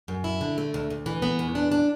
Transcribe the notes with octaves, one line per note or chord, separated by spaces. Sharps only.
F#2
E4
D3
A3
D2
D2
E3
B3
E2
D4
D4